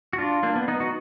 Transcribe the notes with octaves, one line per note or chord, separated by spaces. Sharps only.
F#4
D4 F4
A#3 D4
B3
B3 D#4
D#4 F#4